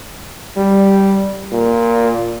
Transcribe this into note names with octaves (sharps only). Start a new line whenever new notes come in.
G3
A#2